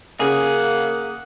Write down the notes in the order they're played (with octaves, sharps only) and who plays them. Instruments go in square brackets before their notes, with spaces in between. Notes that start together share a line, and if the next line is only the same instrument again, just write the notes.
[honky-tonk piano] C#3 [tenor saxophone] A#3 [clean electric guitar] G#4 [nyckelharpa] F#5